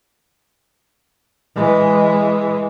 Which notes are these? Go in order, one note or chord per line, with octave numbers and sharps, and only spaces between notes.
E3 G#3